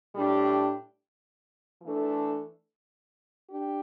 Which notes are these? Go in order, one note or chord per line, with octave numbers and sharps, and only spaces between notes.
A2 G3 D4 G4
E3 A3 D4 A4
D4 G4